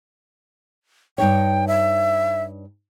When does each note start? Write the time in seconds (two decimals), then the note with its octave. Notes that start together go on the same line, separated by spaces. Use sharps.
1.18 G2 D#4 C#5 G5
1.67 E5